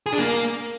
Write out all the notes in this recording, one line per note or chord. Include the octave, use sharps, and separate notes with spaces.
G#4
D4
A#3